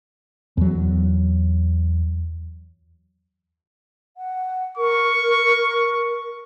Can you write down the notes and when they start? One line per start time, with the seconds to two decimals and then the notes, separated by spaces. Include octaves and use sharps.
0.57 E2 F#3
4.17 F#5
4.77 A#4 C#6